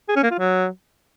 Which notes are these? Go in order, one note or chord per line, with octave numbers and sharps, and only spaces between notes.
G#4
C#4
A#3
F4
F#3